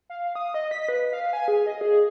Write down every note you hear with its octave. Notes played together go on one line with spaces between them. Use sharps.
F5
D#6
D#5
B6
B4
F5
G#5
G#4
D#5
G#4